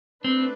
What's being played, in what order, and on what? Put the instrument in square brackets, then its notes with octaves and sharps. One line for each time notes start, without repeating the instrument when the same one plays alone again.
[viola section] A3 D4 B4 [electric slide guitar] C4